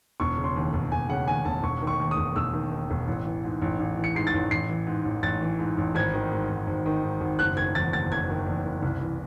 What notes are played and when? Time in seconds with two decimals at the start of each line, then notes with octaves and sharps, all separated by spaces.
0.20 E1 C#6
0.38 C#3
0.44 C6
0.56 D#2
0.73 E1
0.92 E1 G#5
1.09 C#3 F#5
1.27 D#2 G#5
1.45 E1 A5
1.63 E1 C#6
1.81 D#3
1.87 C#6
1.99 D#2
2.11 D#6
2.17 E1
2.36 E1 E6
2.53 D#3
2.71 D#2
2.90 E1
3.07 A1
3.26 E3
3.44 G#2
3.62 A1
3.80 A1
3.97 E3
4.04 C#7
4.15 G#2 C7
4.27 A6
4.34 A1
4.51 A1 C7
4.69 E3
4.87 G#2
5.05 A1
5.23 A1 A6
5.41 E3
5.59 G#2
5.78 A1
5.95 G#1 G#6
6.13 D#3
6.32 G#2
6.50 G#1
6.67 G#1
6.86 D#3
7.04 G#2
7.21 G#1
7.39 F#1 F#6
7.56 D#3 G#6
7.75 E2 A6
7.92 F#1 A6
8.11 F#1 G#6
8.29 D#3
8.46 E2
8.65 F#1
8.82 C2
9.01 E3